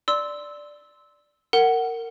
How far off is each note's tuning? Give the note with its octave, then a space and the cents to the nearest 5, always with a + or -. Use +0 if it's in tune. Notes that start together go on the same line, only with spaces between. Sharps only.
D5 +0 C6 -10 E6 -15
A#4 -20 F#5 +10